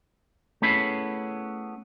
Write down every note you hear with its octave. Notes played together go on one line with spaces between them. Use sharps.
A3 B3 C#4 E4 G#4 B5